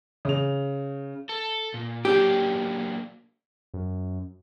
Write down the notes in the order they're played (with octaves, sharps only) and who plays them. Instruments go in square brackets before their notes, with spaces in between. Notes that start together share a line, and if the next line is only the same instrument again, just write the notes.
[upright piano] C#3 F7
[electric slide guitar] A4
A#2
[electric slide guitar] F#3 A#3 D4 [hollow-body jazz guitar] G4
[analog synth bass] F#2